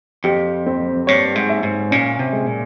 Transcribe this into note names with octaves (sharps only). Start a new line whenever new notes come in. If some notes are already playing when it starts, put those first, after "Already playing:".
F2 G4
C4
G2 C#5
G#2
E5
G#2
A#2 C#4
C3
G#3
A#2